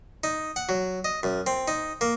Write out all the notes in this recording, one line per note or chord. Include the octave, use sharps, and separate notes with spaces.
D#4
F#5
F#3
D#5
F#2
C4
D#4
A#3